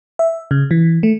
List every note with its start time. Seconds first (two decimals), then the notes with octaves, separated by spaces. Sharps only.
0.19 E5
0.51 C#3
0.71 E3
1.03 A3